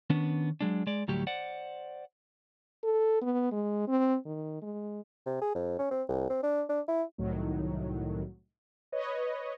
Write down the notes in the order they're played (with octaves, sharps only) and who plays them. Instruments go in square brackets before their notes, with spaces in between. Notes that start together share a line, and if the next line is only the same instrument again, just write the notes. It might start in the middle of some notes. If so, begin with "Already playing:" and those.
[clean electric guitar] D#3 B3 C#4 D4
F#3 G#3 D4
G#3 D5
D2 A2 F#3 G3 G4
C5 D5 F#5
[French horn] A4
B3
G#3
C4
D#3
G#3
[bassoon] C3
G#4
F2
C#4
C4
C2
C4
D4
D4
E4
[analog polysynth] C2 A2 D#3 F#3
B4 C#5 D#5